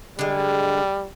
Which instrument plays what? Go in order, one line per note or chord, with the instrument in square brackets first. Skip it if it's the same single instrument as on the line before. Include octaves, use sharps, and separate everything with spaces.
[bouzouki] D3 G#3 [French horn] G3